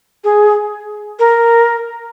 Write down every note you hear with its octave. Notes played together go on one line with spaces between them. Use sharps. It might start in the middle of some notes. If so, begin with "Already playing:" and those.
G#4
A#4